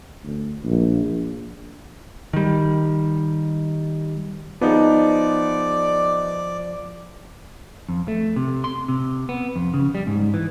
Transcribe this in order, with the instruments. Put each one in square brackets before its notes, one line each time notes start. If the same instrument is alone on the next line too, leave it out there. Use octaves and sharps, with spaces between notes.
[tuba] D2
A#1
[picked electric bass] D#3 G3
[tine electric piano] F3 [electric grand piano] B3 D#4 G#4 [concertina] D5
[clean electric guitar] F2
A3
C3
C6
C3
B3
F2
C#3
G3
G#2
E3